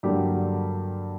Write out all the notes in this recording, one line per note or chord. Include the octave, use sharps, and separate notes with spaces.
G2 D3 F#3 A#3 G4